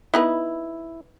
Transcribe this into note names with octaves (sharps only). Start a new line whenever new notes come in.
B3 D#4 E4 B4